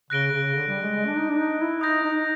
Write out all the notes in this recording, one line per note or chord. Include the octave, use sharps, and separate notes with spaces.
C#3 F#6 A#6 D7 G7
C#3
D3
G3
G#3
G#3
D4
D#4
D4
D#4
E4
D#4 D#6 G6 A#6
D#4